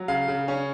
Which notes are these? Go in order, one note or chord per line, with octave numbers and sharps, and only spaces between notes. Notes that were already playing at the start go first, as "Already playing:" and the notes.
Already playing: F#3
C#3 F5
C#3
C#4